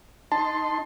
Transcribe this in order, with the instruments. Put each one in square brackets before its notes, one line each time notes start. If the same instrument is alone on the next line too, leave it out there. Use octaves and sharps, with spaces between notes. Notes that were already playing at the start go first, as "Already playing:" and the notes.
[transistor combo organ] D#4 C6 [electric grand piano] A5